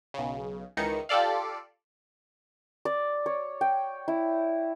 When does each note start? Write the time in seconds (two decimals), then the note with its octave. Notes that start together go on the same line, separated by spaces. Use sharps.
0.14 B1 C#3
0.77 C#2 D#3 E3 D#4 C#7
1.09 F4 G4 A4 D5 F5
2.85 D5
3.26 C#5
3.61 G5
4.08 E4